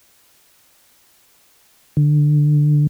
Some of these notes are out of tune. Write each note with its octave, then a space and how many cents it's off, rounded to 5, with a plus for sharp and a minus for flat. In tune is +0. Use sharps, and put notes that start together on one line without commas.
D3 +15